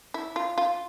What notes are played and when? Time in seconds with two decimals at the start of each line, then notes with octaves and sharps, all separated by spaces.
0.14 E4
0.36 F4
0.58 F4